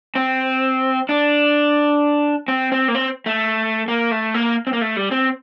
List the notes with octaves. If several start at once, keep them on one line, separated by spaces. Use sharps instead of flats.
C4
D4
C4
C4
A#3
C4
A3
A#3
A3
A#3
C4
A#3
A3
G3
C4